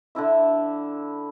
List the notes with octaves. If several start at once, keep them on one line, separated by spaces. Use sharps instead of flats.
D3 D4 E4 E5